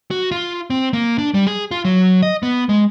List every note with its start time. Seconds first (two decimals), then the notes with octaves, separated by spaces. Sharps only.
0.11 F#4
0.31 F4
0.70 C4
0.93 A#3
1.18 D4
1.34 G3
1.47 G#4
1.71 F4
1.85 F#3
2.22 D#5
2.43 B3
2.69 G#3